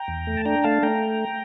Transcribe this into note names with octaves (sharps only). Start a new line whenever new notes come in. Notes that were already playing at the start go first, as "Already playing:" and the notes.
Already playing: G5 A#5
E2
A3
A5
D4 G5 A#5
A3 F5 A5
A3 G5 A#5